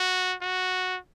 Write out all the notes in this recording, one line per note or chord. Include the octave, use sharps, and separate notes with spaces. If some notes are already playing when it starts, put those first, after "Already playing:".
Already playing: F#4
F#4